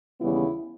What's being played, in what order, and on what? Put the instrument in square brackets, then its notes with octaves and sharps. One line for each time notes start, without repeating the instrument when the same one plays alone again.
[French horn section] D#2 C#3 E3 G3 B3 E4